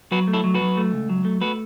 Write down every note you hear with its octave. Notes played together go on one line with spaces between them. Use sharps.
F#3 F#4 B4
A3
E4 A4
F#3
F#4 B4
F#3
A3
C#2
F#3
A3
A3 F#4 B4